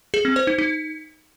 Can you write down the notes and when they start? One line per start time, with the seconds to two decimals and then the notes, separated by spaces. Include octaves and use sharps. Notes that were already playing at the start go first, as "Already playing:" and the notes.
0.14 G#4
0.25 C4
0.36 C5
0.47 D#4
0.58 D#4